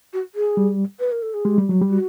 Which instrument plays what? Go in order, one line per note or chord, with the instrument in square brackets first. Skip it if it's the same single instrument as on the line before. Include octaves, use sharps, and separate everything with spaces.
[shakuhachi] F#4
G#4
[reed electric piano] G3
[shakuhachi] B4
A#4
A4
G#4
[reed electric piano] G#3 [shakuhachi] G4
[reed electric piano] G3
F#3
G3
[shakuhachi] F#4